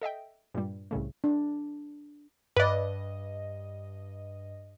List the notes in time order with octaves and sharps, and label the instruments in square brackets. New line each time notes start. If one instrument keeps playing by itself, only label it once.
[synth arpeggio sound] A4 D#5 E5 G5
G2 A#2 G3
C2 A2 C#3 A3
[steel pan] D4
[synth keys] G2 D#5 [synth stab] B4 D5